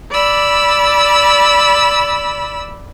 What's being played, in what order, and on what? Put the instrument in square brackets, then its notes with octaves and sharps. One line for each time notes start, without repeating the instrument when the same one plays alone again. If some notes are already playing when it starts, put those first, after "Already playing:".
[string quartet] D5 B5 E6